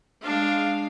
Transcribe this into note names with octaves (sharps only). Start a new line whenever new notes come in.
G#3 D4 F5